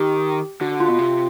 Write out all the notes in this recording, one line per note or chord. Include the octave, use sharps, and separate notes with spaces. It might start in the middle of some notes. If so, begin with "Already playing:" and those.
Already playing: D#3 G4
D3 F#4
F4
B2
C3